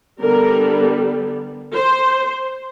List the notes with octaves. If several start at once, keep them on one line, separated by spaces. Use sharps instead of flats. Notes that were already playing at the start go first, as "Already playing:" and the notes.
D3 G3 B3 A#4
C5